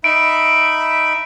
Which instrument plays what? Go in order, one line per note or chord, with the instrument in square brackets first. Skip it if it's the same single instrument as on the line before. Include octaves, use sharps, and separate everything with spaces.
[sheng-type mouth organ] D#4 E5 B5 [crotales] D7